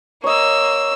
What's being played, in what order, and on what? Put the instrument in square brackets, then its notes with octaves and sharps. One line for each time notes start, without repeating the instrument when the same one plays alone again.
[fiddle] A#3 E6 [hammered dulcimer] C#5 D#5